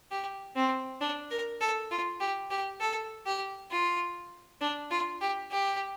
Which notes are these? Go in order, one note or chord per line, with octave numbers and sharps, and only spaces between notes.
G4
C4
D4
A#4
A4
F4
G4
G4
A4
G4
F4
D4
F4
G4
G4